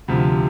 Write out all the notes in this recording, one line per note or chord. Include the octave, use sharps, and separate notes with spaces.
D2 C3 F3